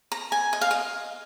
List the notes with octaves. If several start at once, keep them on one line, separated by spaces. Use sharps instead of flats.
A#5
G#5
D#5
F5
D#5